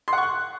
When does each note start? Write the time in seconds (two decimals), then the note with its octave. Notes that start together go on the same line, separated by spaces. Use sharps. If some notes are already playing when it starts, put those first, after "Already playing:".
0.08 C6
0.13 F#5
0.18 C#6
0.23 F#6